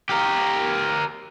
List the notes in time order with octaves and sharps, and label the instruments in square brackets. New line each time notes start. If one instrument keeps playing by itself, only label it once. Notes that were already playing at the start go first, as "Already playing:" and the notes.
[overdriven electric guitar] G4 A#4